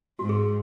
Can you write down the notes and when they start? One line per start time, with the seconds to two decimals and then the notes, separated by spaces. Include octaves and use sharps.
0.19 G#2 F#4
0.29 G#4
0.40 G#4